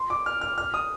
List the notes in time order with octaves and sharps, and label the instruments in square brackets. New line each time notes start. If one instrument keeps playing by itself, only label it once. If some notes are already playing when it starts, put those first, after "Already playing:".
Already playing: [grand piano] C6
D6
F6
F6
F6
D#6